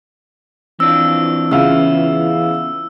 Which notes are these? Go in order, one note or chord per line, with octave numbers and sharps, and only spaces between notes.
E3 C4 D4 F4 E6
C#3 B3 E4 F4 F5 E6